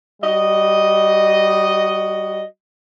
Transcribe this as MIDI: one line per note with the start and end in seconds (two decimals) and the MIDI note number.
0.22 2.44 55
0.22 2.44 66
0.22 2.44 75